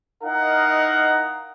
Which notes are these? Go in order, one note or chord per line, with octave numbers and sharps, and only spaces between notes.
D#4 E4 A#4 D#5 F5 F#5